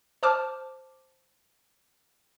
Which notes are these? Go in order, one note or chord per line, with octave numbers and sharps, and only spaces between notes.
C5 A5 D6 F6